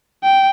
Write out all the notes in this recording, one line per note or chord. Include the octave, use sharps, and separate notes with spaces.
G5